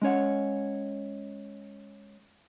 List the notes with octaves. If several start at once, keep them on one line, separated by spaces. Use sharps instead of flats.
G#3 C#4 C#5 F#5